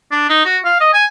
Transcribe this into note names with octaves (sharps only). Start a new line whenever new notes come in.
D4
D#4
F#4
F5
D#5
G#5